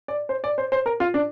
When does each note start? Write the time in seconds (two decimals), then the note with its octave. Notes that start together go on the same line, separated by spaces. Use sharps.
0.08 D5
0.29 C5
0.44 D5
0.58 C5
0.72 C5
0.86 A#4
1.00 F4
1.14 D4